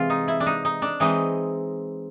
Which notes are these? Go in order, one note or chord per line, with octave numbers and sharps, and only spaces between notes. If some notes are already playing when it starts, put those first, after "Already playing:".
Already playing: C3 E3 G#3 C4 F4
D#4
E4
D4
D#4
D#4
D4
E3 G#3 C4 D#4